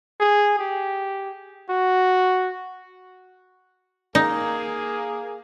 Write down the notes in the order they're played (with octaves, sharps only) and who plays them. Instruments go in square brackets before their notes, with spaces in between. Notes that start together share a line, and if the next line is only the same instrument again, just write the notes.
[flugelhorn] G#4
G4
F#4
[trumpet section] A#3 G#4 [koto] D#4